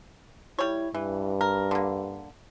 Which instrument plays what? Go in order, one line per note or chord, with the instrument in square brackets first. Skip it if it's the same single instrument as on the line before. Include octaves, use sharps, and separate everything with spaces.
[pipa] G3 C#5 [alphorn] E4
[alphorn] G2 [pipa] E3
[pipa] A#4
D3 A#3